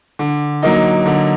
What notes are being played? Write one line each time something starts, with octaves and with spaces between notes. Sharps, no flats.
D3
F#3 A#3 D#4
D3